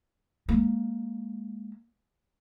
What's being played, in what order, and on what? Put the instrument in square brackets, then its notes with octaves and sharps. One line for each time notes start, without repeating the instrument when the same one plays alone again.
[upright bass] G#3 A#3